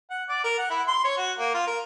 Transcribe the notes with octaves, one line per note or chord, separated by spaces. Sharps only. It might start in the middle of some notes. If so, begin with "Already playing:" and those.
F#5
D5
A#4
F#5
E4
C6
C#5
F#4
A#3
F4
A#4